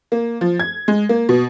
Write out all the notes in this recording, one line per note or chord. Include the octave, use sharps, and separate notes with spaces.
A#3
F3
G#6
G#3
A#3
B2